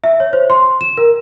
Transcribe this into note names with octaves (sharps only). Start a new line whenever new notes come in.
E5
C#5
C5
C6
E7
A#4